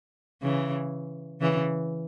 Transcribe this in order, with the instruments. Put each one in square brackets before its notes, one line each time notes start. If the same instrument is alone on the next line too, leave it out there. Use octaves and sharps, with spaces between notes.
[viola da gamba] C#3 E3
C#3 E3